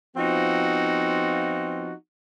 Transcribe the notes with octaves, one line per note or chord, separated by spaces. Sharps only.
F3 B3 C4 D#4 F4 F#4